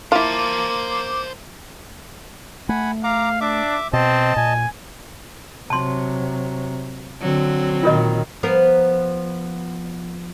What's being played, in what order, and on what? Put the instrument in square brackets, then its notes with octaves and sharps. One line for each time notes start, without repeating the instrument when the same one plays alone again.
[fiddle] A#3 [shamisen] E4 F4 [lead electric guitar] C5 A5 [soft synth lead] D6
[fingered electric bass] A3 [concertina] F#5 G#5 B5
[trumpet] F5 [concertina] A#5 D6
[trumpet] D4 [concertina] E5 D6
[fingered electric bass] B2 [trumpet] C4 [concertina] D#5 A5
[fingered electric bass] A#2 [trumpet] G#5
[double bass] C3 F#3 [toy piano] A5 C6
[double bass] D3 [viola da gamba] F#3 C4
[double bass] A#2 D#3 [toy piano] F4 A#4 D#5
[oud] F3 B3 A#4